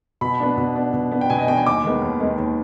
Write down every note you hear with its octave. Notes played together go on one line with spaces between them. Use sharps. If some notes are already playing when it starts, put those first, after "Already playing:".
B2 B5
B3 D4
B2
B3 D4
B2
B3 D4
G5
B2 G#5
D#5
B3 D4 G5
G#5
D#2 D6
D#3 G#3 B3
D#2
D#3 G#3 B3
D#2